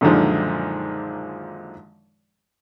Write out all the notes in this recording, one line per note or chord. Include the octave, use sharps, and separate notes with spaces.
F#2 A#2 D3 D#3 F3 G#3